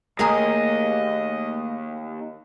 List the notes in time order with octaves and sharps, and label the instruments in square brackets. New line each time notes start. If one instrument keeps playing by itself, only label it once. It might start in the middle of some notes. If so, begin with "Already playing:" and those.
[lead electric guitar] D#2 [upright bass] A3 A#3 [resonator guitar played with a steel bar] G#4 A#4 G#5 [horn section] D#5